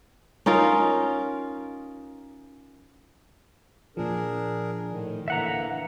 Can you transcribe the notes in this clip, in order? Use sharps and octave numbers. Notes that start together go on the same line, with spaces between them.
C#4 D#4 F4 A#4
A#2 F3 D4 G#4 A#4
A2 D#3
D3 E3 A#3 E5 F#5 A#5